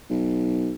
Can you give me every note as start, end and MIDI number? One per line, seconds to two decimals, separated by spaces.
0.10 0.74 35